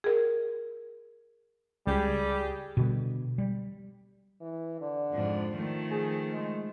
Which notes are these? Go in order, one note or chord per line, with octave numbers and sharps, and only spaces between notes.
G#4 A#4
C#2 G3 G4 G#4
B2 D3 G3
G3
E3
D3
F2 G#2 F3
D#3 F3 A3
G#4
G#3